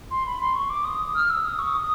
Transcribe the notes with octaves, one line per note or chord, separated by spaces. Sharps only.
C6
B5
C6
C#6
D6
D#6
F6
E6
D#6
C#6
D#6